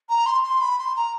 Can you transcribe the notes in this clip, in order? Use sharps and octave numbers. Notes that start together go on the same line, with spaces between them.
A#5
C6
C6
B5
C6
A#5